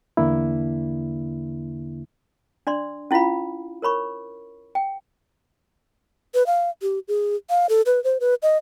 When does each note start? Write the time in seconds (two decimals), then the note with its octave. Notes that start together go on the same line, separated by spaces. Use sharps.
0.17 E2 D3 A#3 D4 E4
2.67 D4 D5 C6
3.11 C#4 E4 F4 F5 B5
3.82 A#4 C#5 B5 C#6
4.75 G5
6.34 B4
6.46 F5
6.82 G4
7.08 G#4
7.50 F5
7.69 A4
7.86 B4
8.04 C5
8.20 B4
8.42 D#5